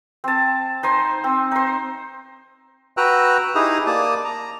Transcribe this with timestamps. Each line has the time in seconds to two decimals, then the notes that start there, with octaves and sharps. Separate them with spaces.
0.24 C4 A5
0.83 D#4 C5 G#5
1.24 C4
1.52 D#4 C5
2.97 F#4 B4 G5 A#5 E6 F#6
3.55 D#4 E4 G4 G#4 A#5 D#6
3.87 A#3 D5 A5 D6 D#6
4.25 A#5